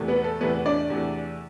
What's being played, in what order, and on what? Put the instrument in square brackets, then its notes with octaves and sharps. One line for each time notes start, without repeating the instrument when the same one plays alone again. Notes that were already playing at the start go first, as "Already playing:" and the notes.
Already playing: [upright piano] E2 C3 E3 A3
B3 B4
A4
E2 C3 E3 A3 B3 B4
D4 D5
E2 C3 E3 A3